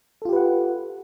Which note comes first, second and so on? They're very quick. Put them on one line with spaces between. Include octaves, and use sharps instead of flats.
A4 F4 G4 B4 F#5